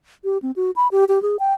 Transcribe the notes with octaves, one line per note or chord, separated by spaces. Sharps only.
G4
C4
F#4
B5
G4
G4
G#4
G5